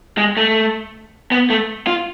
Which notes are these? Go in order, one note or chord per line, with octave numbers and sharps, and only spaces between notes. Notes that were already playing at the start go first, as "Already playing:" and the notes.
G#3
A3
B3
A3
F4